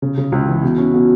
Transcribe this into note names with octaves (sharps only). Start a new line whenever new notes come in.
C#3
C#3
C#2
E3
B2
C#4
B2